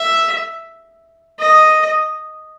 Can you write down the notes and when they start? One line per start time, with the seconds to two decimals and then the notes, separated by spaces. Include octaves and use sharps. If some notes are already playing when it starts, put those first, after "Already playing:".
Already playing: E5
1.39 D#5